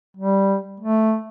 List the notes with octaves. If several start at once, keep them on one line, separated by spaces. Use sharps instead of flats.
G3
A3